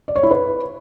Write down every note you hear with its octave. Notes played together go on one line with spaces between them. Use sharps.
D5
C#5
E4
B4